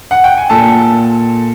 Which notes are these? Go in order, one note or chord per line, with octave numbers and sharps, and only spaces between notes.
F#5
G5
G#5
A#2 A4 A5